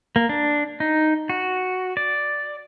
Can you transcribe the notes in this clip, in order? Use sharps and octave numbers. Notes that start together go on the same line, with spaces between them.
A#3
D4
D#4
F#4
D5